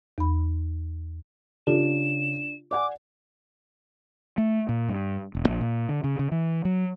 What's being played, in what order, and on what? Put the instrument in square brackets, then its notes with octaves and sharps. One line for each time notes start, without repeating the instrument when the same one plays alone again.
[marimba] E2 B5
[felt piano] C#3 [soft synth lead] D4 [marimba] F4 G4 A4 [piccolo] E7
[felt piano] D5 F#5 G#5 [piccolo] D6
[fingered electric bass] A3
A#2
G2
E1
A#1
A#2
D3
C#3
C#3
E3
F#3